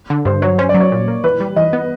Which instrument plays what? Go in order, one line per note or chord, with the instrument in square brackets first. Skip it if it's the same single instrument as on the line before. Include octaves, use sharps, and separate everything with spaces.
[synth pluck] D3
[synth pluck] G2 [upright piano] C5
[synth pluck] F#3 [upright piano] C#5
[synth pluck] C#4 [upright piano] C5
[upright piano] D5
[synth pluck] F#3
[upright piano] C#5
[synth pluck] A#2
A#3
[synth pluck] E3 [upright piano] B4
[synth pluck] G3
[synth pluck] E3 [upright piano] D#5
[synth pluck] B3